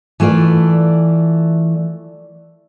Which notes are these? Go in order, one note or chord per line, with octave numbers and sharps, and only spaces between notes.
E3 A3 F4 A4 D5